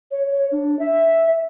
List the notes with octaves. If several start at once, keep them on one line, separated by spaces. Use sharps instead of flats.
C#5
C#5
D4
E5